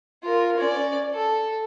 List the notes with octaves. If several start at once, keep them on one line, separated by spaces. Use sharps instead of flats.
F4 A#4
C#4 D5
A4